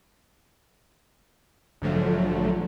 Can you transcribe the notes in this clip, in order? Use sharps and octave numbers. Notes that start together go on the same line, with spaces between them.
A#1 G#2 D3 F3 F#3 A3